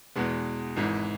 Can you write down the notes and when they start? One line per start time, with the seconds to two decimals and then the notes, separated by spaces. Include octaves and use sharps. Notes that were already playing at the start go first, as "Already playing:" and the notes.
0.16 E2 B2 G#3 B3
0.76 G#1 G#2 E3